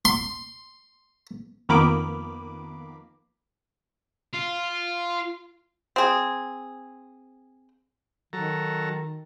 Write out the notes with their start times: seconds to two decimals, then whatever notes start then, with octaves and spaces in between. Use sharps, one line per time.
0.05 C6
1.69 F2 D#3 A#3 B3 B5 D6
4.33 F4
5.96 C4 G#4
8.33 D#3 F#3 A4 A#5